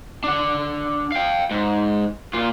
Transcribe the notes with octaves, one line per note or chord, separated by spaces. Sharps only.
D4 F#5
F5 G5
G#2
A#2 F4